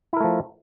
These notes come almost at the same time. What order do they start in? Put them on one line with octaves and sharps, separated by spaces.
E4 A#4 A3 F3